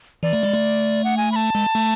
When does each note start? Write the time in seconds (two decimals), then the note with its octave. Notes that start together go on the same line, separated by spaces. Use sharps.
0.23 E3 D5
0.33 A3
0.43 G#3
0.54 A3
1.04 F#5
1.17 G#5
1.32 B5
1.36 A5
1.55 G#3
1.75 A3